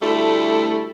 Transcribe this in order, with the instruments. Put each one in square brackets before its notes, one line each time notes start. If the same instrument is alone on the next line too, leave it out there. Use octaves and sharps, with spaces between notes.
[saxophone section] D2 G3 A3 E4 A4